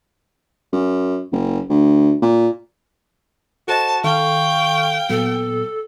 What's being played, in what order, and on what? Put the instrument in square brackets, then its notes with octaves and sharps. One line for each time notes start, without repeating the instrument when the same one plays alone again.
[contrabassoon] F#2
F#1
D2
A#2
[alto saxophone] F#4 [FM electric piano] A4 C5 D#5 [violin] A5
[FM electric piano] D#3 A4 [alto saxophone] F5 [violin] G5 [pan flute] C#6
[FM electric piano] A#2 F#3 B3 [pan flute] A4